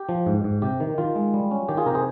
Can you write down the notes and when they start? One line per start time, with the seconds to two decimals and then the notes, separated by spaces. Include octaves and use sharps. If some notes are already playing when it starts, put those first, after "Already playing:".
Already playing: G4
0.09 F3
0.26 G#2
0.44 G#2
0.62 C3 G4
0.80 D#3
0.98 D#3 F4
1.15 G#3
1.34 G3
1.51 C#4
1.69 D#3 G4
1.77 F4 G#4
1.86 C3 G4 A#4
1.95 G#4 C5